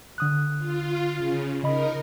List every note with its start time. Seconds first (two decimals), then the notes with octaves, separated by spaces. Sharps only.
0.18 D3 D#6 F#6
0.58 F4
1.14 C#3
1.63 C#3 D#4 A#4 D#5 B5